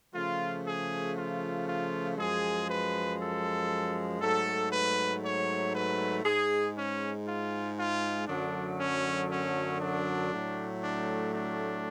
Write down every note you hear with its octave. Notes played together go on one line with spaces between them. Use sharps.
C#3 F3 A3 F4
G#4
F4
F4
F#2 F3 G#3 G#4
B4
A4
G#2 F#3 A3 A4
B4
C#5
B4
G#2 G#3 G#4
C#4
F4
F4
F#2 D3 F#3 A3 D4
C#4
C#4
D4
A2 F#3 A3
D4
D4